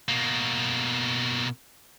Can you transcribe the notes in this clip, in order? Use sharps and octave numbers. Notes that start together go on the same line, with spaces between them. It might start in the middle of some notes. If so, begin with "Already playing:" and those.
B2 A#3